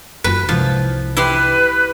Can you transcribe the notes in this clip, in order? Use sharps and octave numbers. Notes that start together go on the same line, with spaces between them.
F#2 F4 B4
C2 G#2 F3
E4 G4 B4 C6